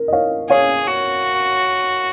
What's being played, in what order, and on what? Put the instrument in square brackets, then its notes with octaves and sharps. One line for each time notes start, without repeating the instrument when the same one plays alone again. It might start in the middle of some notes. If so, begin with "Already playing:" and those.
Already playing: [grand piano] A#4
D#5
C#5 F5
[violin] G#4 [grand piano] C#5 F5
[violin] F#4